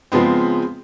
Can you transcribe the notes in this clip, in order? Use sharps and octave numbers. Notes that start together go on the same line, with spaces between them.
C#3 F3 G#3 B3 C4